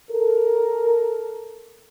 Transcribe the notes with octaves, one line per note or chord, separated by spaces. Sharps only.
A4 A#4